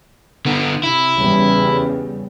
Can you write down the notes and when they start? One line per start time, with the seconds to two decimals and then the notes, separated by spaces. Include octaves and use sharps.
0.46 D3 B3
0.83 C3 E4
1.18 E2 C#3 G3